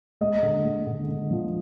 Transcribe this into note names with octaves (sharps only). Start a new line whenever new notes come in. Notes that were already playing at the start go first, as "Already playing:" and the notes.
G#3 D#5
D3
G#3
D3
D3
F3